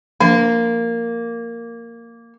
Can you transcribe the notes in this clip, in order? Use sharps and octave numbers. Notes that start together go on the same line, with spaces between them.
F3 A#3 D4